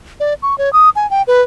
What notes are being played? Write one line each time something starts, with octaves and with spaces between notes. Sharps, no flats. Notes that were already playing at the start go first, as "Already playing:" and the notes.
D5
C#6
C#5
D#6
G#5
G5
B4